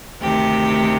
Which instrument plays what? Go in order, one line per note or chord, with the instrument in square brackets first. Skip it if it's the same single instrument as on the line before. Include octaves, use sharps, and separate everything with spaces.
[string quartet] D2 C3 D#3 G4